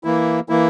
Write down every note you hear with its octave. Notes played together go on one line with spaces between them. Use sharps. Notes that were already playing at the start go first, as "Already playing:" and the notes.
E3 A#3 E4
E3 A#3 E4